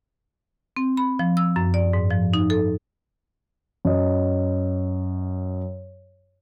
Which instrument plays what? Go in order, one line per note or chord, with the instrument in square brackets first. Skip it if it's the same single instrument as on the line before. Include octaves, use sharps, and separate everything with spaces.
[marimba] C4
B5
F3
E6
F#2
D5
G#2
F3
D#4
A4
[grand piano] F#2 D#5